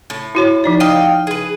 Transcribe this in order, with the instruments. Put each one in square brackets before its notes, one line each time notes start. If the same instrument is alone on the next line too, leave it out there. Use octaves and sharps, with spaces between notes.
[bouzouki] A2
[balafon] E4 F#4 C#5
F3 D#4 D5
[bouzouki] D#5 F5 G5
G#4 B4